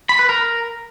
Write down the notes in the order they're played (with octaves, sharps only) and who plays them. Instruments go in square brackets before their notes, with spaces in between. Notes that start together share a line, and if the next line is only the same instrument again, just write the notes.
[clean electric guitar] B5
B4
A#4